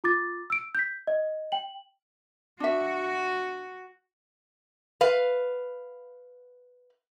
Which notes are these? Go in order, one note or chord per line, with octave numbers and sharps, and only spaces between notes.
F4 D6 A6
E6 D7
G6 B6
D#5
G5 F#7
D4 F#4 E5
B4 F5